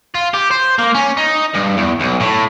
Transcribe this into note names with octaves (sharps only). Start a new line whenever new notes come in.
F4
G4
C5
A#3
C#4
D#4
G2
E2
B1
A2